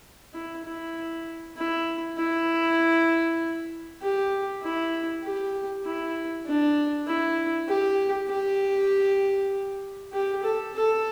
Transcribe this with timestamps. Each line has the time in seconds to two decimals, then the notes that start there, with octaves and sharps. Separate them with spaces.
0.34 E4
0.65 E4
1.57 E4
2.18 E4
4.02 G4
4.62 E4
5.23 G4
5.85 E4
6.46 D4
7.07 E4
7.68 G4
8.29 G4
10.13 G4
10.43 A4
10.74 A4